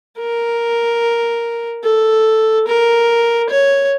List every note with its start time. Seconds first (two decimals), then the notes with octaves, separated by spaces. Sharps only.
0.19 A#4
1.84 A4
2.67 A#4
3.50 C#5